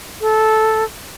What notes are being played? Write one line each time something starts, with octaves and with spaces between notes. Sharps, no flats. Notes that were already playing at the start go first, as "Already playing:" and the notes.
A4